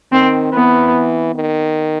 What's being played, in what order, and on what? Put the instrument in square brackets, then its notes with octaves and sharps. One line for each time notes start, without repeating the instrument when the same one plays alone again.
[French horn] D#3 [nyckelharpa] C4
[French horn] E3 [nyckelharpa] B3
[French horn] D#3